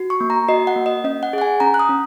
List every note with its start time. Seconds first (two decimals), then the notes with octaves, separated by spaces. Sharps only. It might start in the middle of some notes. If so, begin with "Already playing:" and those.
Already playing: F#4
0.10 C#6
0.20 A#3
0.30 A#5
0.48 F#4 D#5
0.67 F#5
0.76 A#3
0.86 D#5
1.04 C#4 D#5
1.23 F#5
1.33 G#4 F#5
1.41 G#5
1.60 C#4 A#5
1.74 F#6
1.80 D#6
1.89 C#4